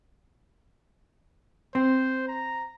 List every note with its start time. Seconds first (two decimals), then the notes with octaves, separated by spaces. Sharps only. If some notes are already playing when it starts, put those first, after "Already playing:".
1.75 C4 C5
2.28 A#5